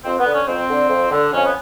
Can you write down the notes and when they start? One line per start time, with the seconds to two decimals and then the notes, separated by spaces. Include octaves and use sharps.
0.04 F2 C4
0.18 B3
0.25 D3
0.33 C#4
0.47 F2 C4
0.68 D3
0.90 F2
1.10 D3
1.33 F2 C#4
1.44 B3